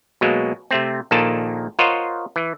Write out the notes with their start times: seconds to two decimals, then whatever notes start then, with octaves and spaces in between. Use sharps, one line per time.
0.21 B2 F#3 G#3 A#3
0.71 C3 A3 C4
1.11 A#1 A#2 D#3 A#3 A4 A5
1.79 F4 A#4 C5 C#5 D#5 F#5
2.36 E3